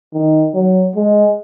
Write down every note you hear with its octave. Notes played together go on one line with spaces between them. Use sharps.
D#3
F#3
G#3